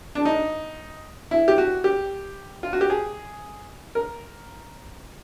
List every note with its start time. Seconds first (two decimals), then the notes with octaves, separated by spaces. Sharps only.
0.15 D4
0.25 D#4
1.31 E4
1.48 G4
1.58 F#4
1.84 G4
2.63 F4
2.73 F#4
2.81 G4
2.90 G#4
3.95 A#4